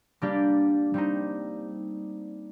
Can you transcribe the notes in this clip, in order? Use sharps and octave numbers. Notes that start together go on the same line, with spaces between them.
G3 A#3 D4 G4 D5
G3 C4 D#4